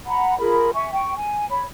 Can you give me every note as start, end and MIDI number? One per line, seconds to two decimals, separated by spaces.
0.07 0.38 78
0.07 0.38 82
0.07 0.38 83
0.39 0.70 65
0.39 0.70 68
0.39 0.70 70
0.39 0.70 83
0.75 0.92 76
0.75 0.92 80
0.75 0.92 85
0.92 1.14 79
0.92 1.14 85
1.16 1.48 80
1.50 1.64 73
1.50 1.64 83